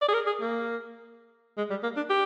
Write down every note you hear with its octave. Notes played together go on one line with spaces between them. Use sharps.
D5
G#4
A#4
G#4
A#3
G#3
G3
A#3
D4
G4